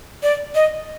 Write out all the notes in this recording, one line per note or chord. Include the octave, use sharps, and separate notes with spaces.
D5
D#5